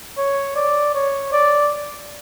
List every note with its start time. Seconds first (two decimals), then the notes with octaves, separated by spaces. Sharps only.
0.18 C#5
0.56 D5
0.94 C#5
1.32 D5